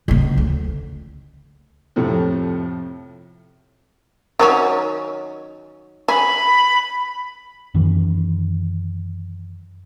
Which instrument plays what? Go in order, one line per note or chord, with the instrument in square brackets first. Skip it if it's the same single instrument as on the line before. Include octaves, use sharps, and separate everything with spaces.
[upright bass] C#2 C#3
D2
[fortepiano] F2 A2 C3 F3
[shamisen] D#3 F#3 C#4
[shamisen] G#4 [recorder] B5
[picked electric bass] F#2 D#3 E3